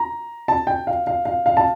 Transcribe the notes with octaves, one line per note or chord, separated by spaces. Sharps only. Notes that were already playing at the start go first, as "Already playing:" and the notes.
Already playing: A#5
A5
G5
F5
F5
F5
F5
A5